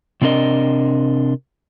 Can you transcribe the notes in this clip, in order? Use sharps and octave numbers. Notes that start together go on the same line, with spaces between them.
C3 C4 D4 A#4 D#5